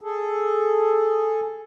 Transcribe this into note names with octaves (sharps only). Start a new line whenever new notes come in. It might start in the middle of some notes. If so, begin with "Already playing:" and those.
G#4 A4